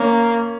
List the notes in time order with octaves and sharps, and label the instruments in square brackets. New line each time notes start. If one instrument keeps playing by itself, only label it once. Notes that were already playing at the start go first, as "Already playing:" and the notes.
Already playing: [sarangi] A#3 [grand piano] C#4